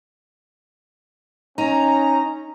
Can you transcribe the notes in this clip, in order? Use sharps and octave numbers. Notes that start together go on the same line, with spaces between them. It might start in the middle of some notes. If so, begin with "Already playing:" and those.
C#4 D#4 A#5